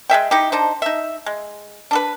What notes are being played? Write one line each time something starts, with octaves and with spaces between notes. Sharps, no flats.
G#3 G#4 E5 G5
D#4 E4 G4
D4 D#4 C5
D#4 E5
G#3
D4 A4 B4